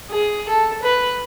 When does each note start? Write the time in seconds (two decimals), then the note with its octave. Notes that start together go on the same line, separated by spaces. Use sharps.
0.11 G#4
0.49 A4
0.83 B4